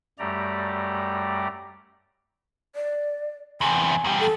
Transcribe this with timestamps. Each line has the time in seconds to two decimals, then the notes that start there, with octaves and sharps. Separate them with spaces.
0.19 F#2 G3 A3 G4 D5 A#5
2.76 D5
3.61 E2 C3 G#5
4.04 E2 G3
4.20 A4